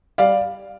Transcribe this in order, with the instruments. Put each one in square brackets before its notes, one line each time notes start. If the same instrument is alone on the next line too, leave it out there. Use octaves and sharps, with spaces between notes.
[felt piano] G3 D5 F5